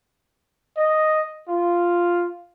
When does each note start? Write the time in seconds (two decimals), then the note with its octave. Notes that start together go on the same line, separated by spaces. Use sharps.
0.77 D#5
1.48 F4